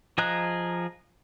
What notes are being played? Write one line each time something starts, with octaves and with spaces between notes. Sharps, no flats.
F3 G#4 D#5 A#5 F#6